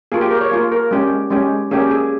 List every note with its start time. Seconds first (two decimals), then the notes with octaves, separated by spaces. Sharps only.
0.12 A#3 F4 G#4
0.21 G4
0.31 A#4
0.41 C#5
0.51 A#3 F4
0.72 A#4
0.91 G#3 C#4 G4
1.30 G#3 C#4 G4
1.71 A#3 C#4 G4 G#4
1.91 G#4